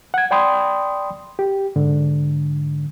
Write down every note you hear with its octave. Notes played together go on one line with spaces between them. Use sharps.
F#5 G#6
D5 G5 B5 C6 D#6
G4
G#2 D3